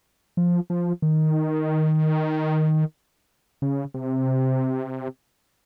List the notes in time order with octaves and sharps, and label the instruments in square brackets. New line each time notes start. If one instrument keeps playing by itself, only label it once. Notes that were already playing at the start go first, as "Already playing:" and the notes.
[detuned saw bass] F3
F3
D#3
C#3
C3